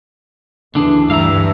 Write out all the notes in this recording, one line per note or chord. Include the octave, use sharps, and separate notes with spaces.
D2 D3 E3 D4 G#4
G2 E5 F5 A#5